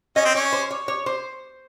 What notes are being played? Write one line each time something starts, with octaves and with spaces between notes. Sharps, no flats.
C#4 D#5
C4
C#4 C#5
C5
C#5
C#5
C5